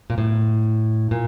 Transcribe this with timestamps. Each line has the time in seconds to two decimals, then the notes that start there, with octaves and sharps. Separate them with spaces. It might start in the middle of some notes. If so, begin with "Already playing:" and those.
0.10 A#2
0.18 A2
1.11 A#2